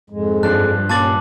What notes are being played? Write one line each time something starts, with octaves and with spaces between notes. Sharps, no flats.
F2 G#2 G#3
G2 F3 D4 A5 F#6
D#2 A#2 C#4 A5 D6 A6 F#7